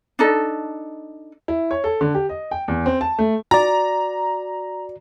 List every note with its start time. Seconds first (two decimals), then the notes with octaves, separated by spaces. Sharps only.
0.19 D4 D#4 A4
1.48 E4
1.71 C#5
1.84 A4
2.01 D3
2.15 G4
2.29 D#5
2.51 G5
2.68 E2
2.86 C4
3.01 A5
3.19 A3
3.51 F#4 D5 A#5